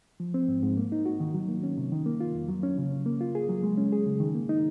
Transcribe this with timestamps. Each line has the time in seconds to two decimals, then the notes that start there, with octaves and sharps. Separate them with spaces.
0.20 F3
0.34 C4
0.48 G#2
0.63 G#2
0.77 A#3
0.92 D#4
1.06 F#4
1.20 D#3
1.34 F#3
1.49 A#3
1.63 C#4
1.78 C3
1.92 D#3
2.06 A#3
2.20 F4
2.35 F2
2.48 F#3
2.63 C#4
2.78 C#3
2.92 C#3
3.06 A#3
3.21 F4
3.35 G#4
3.49 F#3
3.63 G#3
3.78 C#4
3.92 G#4
4.06 C#3
4.20 D#3
4.35 A#3
4.49 D#4